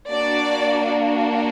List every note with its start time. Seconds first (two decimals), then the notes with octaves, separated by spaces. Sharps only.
0.10 A#3 D4 F#4 D5